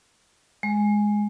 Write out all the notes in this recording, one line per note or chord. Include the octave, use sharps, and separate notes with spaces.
G#3